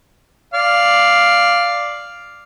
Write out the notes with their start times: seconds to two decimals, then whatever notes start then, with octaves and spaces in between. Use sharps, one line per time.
0.54 D5 F5